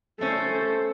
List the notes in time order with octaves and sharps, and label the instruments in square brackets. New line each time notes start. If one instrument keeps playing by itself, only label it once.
[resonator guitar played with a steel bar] A3 C#4 [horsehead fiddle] A4 C5